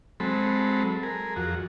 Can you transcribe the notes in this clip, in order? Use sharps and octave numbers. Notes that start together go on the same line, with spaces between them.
F#3 G#3 C4 A4 B5
G#4 A#4
F2 F#4